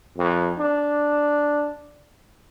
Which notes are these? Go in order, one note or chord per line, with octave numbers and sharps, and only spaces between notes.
F2
D4